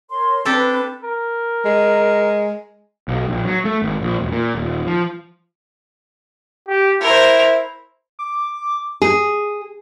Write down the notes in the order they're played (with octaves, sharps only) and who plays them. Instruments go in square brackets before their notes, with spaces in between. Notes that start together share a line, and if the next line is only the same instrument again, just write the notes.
[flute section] A#4 C#5 C6
[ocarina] C4 [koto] D4 G4 A4 [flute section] B4
[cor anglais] A#4
[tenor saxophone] G#3
[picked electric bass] B1
A#1
F#3
A3
G#1
A#1
E1
A#2
D#1
F3
[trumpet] G4
[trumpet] E4 [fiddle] A#4 C5
[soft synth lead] D6
[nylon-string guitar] G#4